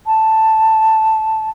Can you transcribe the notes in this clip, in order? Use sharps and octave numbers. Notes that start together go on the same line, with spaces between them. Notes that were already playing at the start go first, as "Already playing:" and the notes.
A5